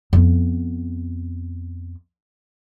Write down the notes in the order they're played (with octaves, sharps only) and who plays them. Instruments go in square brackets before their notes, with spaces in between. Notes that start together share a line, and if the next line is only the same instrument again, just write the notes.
[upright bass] F2 B3